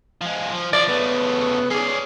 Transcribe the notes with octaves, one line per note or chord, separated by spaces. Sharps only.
F3 G#3
F3
F3 D5
C#3 A3 B3
C#4 G#4 D5